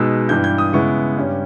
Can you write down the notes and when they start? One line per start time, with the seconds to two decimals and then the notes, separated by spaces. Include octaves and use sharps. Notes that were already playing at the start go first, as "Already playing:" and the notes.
Already playing: B2 G#3 B3 D#4 E6
0.29 G2 E3 G3 G6
0.44 G6
0.58 D#6
0.73 C#3 G#3 B3 E4 C#6
1.17 G2 G3 C#4